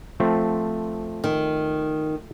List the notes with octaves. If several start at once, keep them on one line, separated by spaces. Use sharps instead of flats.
F3 A3 C4
D#3